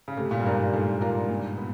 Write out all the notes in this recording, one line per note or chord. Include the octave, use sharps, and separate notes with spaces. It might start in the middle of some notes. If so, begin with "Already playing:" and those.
C#3
C3 A3
A#2
G2
G#2 D4 F4 A#4
G#2 A3
D4 F4 A#4
A#2
B3